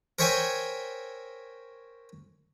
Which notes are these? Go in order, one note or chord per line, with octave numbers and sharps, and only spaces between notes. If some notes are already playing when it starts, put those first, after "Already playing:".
A#4 C5 C#5 E5 G5 G#5